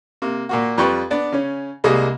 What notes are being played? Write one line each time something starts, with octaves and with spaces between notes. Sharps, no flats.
C3 A#3
A#2 A#3 F#4
F2 G3 F4 B4 G5 C#6
B3 D4 D5
C#3 C#4
C2 G3 G#3 A#3 D#5